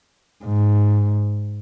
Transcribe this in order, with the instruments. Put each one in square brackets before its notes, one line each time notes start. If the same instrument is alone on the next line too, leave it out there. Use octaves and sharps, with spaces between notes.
[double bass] G#2